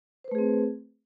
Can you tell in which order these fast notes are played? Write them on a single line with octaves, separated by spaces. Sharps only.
C5 B4 A3 G#4 C4